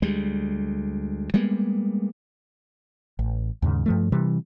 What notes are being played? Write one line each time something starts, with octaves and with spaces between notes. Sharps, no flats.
D2 G3 G#3
G3 G#3 A#3 B3
A1
D#2 G#2 C#3
G2 F3 A3
C3 E3 G3